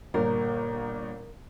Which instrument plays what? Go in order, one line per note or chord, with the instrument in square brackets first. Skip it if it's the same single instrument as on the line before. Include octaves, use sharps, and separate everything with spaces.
[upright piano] G1 A#2 [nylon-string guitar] A#4